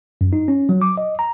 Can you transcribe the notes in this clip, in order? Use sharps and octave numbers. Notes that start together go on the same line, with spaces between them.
F#2
D#4
C#4
F#3
D6
D#5
A#5